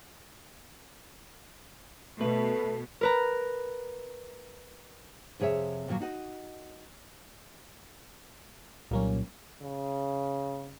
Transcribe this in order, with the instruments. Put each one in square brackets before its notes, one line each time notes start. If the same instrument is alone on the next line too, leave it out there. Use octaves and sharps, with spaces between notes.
[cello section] B2 [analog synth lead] A3 [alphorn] A4 [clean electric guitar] B4
[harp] A#4 B4 A#5
[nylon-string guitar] F2 C3 G#4 C#5 E5
D#2 A#2 F3 F#3
D#4 F#4 D#5
[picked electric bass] C2 F#3 [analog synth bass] A#2 [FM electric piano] G3 A#3 C#4
[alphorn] C#3